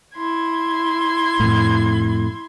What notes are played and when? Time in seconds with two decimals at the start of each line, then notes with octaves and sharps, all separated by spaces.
0.14 E4 C6 G#6
1.40 F2 A2